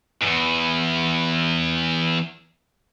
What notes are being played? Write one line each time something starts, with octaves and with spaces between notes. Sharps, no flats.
E2 G#2